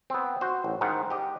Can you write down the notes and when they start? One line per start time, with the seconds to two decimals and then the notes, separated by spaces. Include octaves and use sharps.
0.10 B3 C4
0.41 F#4 C5
0.64 A1
0.81 G#2 D#3 F#5
1.10 G4 D#5